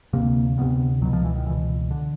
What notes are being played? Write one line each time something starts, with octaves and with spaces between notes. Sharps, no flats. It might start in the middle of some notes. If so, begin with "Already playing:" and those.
D2 C3 A#3
D2 C3 B3
C#2 B2 F#3
F3
E3
D#3
C#2 B2 E3
D3